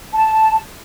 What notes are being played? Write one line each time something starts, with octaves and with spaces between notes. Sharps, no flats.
A5